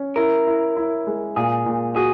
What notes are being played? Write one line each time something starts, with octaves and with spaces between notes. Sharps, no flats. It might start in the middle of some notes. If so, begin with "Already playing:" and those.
Already playing: C#4
E4 A#4
E4
E4
G#3
A#2 G#4
A#2
F#4 G#4